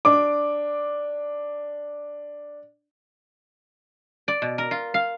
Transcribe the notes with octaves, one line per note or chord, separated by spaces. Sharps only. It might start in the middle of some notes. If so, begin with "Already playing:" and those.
D4 D6
D5
B2
A#4
F4
F5